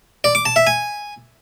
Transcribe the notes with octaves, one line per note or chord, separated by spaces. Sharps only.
D5
D6
A5
E5
G#5